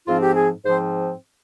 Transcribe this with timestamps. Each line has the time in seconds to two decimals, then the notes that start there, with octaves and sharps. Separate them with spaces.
0.05 G#2 F3 C4 F4
0.20 G4
0.35 G#4
0.64 G#2 F3 C4 C5